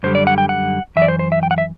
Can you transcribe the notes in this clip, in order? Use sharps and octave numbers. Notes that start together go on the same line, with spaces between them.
F#2 D3 G3 C5
D5
F#5
G5
F#5
F#2 E3 E5
D5
C5
C5
E5
G5
F#5
E5